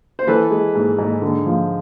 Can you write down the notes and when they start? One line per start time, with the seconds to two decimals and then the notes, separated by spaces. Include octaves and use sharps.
0.19 C5
0.27 E3 A4 B4
0.51 G#3
0.75 G#2
0.99 G#2
1.22 D3
1.46 F3